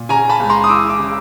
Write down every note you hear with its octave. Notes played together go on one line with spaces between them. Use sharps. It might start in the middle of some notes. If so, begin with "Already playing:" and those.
Already playing: A#2
C#3 G#5 A#5
A5 B5
C#2
A#5 C6
D#6
E3 D6 E6
D6 E6
C#3